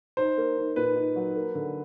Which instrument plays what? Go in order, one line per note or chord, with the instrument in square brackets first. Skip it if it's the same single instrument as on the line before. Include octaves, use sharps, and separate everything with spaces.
[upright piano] D#4 [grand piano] C5
[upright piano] A#3
D#4
[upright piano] A#2 [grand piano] B4
[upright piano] D#4
F#3
A#3
D3